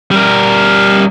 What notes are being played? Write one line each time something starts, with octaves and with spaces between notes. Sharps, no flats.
G3 A#4